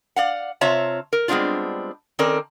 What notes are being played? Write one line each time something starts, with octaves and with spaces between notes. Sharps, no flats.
D5 F5 F#5
C3 C4 F4 C#5 E5 A5
A#4
G3 G#3 B3 C4 D4 F4
D#3 C4 C#4 A4 A#4 D5